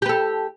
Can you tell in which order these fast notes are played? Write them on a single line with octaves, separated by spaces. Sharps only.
G4 B4 A4